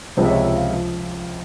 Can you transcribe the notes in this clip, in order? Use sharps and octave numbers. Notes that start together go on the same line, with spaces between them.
C#2 C3 F3 G#3 C5
E5
C#5
E5
F5
F3